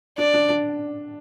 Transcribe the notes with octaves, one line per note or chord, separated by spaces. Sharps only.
D4 D5
D4
D4